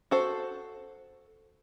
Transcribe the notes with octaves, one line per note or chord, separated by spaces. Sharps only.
F#4 A4 C5